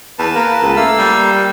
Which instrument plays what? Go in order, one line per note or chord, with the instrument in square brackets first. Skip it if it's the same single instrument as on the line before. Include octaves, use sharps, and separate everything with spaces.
[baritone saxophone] E2 [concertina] B4 A5
[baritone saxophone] A#3
C#2
[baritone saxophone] A3 [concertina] A#3 F5 E6
[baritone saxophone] G3